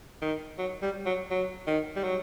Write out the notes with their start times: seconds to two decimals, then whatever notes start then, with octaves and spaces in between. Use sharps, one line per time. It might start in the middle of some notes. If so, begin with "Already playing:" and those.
0.22 D#3
0.59 F#3
0.83 G3
1.06 F#3
1.31 F#3
1.67 D#3
1.96 G3
2.04 F#3